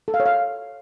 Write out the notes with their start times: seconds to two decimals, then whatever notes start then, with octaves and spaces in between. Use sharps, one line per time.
0.08 A4
0.14 F5
0.20 C#5
0.26 F5